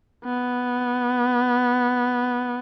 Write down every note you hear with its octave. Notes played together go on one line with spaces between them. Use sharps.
B3